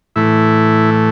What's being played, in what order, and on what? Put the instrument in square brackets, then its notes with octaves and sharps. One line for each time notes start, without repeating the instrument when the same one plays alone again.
[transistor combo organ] A2 E3 A3 E4